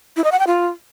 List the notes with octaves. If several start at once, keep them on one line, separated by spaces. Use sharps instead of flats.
E4
D#5
F#5
G5
F4